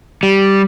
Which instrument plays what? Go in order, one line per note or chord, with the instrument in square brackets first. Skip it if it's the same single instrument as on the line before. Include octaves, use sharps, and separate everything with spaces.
[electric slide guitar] G3